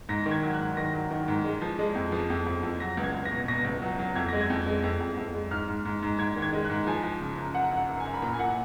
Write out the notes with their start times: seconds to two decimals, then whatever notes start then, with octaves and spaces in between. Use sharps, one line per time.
0.09 G#2 A#6
0.26 D#3
0.31 G#6
0.43 F#3
0.54 F#6
0.60 G#2
0.77 D#3 A#6
0.94 F#3
1.11 D#3
1.28 G#2
1.45 G#3
1.61 F3
1.79 G#3
1.95 F2
2.12 F3
2.30 F2
2.46 F2
2.63 F2
2.80 F#3 A#6
2.97 C#2
3.03 G#6
3.14 C#2
3.25 A#6
3.31 B2
3.48 B2 A#6
3.65 C#2
3.82 F#3
3.99 F#3
4.15 F2 G#6
4.28 G#3 A#6
4.41 G#6
4.50 F2
4.66 G#3
4.83 F2
5.00 F2
5.17 F2
5.34 G#3
5.51 G#2 F6
5.68 G#2
5.85 G#2
6.03 G#2
6.19 G#2 G#6
6.36 D#3
6.42 G#6
6.53 G#3
6.65 F#6
6.70 G#2
6.87 F3 G#5
7.04 F3
7.21 C#3
7.37 F#2
7.54 F#2 F#5
7.71 F#2
7.77 F#5
7.89 F#2
8.00 G#5
8.05 F#2
8.14 B5
8.22 A#2 A#5
8.34 G#5
8.39 A#2 F#5